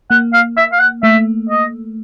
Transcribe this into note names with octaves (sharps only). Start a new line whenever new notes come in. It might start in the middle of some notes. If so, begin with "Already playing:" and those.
A#3 F#5
F5
E5
F5
F#5
A3 E5
D#5